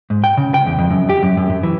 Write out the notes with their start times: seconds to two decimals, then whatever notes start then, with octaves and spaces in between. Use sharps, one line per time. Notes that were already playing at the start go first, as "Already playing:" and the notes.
0.10 G#2
0.24 G5
0.37 C#3
0.54 G5
0.66 E2
0.79 F2
0.90 F#2
1.09 G4
1.23 F#2
1.37 F#2
1.50 F#2
1.63 E3